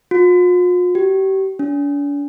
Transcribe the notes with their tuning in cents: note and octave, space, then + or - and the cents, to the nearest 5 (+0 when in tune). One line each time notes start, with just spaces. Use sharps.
F4 +45
G4 -35
D4 -45